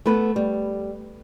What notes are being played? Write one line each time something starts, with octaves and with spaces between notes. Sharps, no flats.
A3 B3 B4
G3